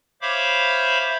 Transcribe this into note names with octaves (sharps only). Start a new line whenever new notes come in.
C5 C#5 E5 F5 B5 D6